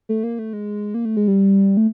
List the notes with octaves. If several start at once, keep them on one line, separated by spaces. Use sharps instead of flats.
A3
A#3
A3
G#3
A#3
A3
G#3
G3
A3